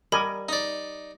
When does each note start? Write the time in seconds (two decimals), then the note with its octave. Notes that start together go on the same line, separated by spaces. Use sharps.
0.12 G3 A#4 D#5 G#5 B5
0.49 D#4 D5